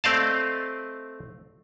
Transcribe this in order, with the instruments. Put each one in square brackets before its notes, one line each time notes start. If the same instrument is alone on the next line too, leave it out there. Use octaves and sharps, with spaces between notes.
[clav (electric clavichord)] A3 C4 D5 D#5 F5 A5